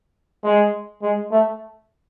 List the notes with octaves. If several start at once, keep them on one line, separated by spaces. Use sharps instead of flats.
G#3
G#3
A3